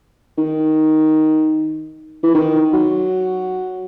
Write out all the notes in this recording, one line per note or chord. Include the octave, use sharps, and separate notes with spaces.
D#3
E3
D#3
F#3